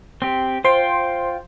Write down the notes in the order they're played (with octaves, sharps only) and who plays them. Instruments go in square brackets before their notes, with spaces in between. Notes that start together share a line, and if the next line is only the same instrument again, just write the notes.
[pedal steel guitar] C4 G4
[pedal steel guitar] F4 G5 [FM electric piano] C5 C6